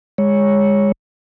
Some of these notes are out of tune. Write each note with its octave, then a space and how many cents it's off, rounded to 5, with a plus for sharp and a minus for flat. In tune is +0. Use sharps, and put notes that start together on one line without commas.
G#3 -25 C#5 +0